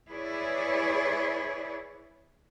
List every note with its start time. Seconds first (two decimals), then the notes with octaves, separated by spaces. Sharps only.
0.11 E4 G#4 B4 C#5 D5